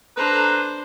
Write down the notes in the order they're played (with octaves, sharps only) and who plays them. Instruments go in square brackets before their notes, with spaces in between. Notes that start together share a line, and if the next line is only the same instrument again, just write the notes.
[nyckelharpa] D4 C5 [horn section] A4 B4 A#5